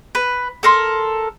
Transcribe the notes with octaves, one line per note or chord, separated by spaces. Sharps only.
B4
A4 A#4 C6